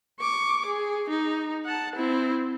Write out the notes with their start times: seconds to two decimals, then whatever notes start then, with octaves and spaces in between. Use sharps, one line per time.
0.20 C#6 D6
0.66 G#4
1.09 D#4
1.65 F#5 A5
1.95 C4 E4